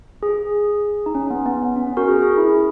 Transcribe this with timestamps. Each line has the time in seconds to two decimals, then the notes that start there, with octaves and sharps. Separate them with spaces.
0.23 G#4
1.06 D#4
1.15 C#4
1.30 B3
1.46 B3
1.76 C#4
1.87 C#4
1.97 F#4 A#4
2.08 G#4
2.22 G#4
2.38 E4